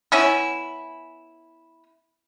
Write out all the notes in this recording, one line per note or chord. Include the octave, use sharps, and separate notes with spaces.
B3 C#4 E4